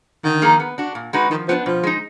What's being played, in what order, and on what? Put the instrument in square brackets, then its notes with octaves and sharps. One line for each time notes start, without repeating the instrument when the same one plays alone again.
[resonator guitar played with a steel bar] D3 [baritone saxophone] D#3
[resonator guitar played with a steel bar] F3 A#3 D#4 G#4
B3
D4 F#4
A#2
G#3 D#4 F#4 B4
[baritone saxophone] D#3 [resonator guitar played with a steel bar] F3
[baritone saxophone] F3 [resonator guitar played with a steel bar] B3 D4
[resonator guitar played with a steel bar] B2 [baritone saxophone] F3
[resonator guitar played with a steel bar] G#3 D#4